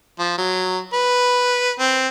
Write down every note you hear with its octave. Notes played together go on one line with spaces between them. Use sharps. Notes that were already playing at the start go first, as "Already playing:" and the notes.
F3
F#3
B4
C4